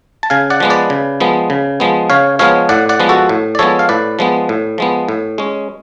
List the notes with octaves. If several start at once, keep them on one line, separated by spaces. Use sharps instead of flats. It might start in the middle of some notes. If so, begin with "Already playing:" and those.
A5
C#3 F5 G#5
D5 F#5
F3 G#3 B3
B4 D5
C#3
F3 G#3 B3
C#3
F3 G#3 B3
C#3 C#5 F5
F3 G#3 B3 C#5 F5
A2 D5 F#5
D5 F#5
F3 G#3 B3
F#4 A4
A2
D5
F3 G#3 B3 A4 C#5
F5
A2 B4 D5
F3 G#3 B3
A2
F3 G#3 B3
A2
G#3 C#4